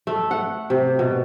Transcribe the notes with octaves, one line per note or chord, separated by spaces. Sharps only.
A3
F#5
C3
B2